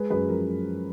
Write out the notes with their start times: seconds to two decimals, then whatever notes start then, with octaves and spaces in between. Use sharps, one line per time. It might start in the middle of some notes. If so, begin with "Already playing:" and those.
Already playing: G#3 G#4 B4
0.10 F#2 G#4 B4
0.29 F3 A#4